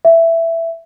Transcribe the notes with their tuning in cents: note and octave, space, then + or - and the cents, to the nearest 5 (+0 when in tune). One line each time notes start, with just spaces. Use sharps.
E5 +10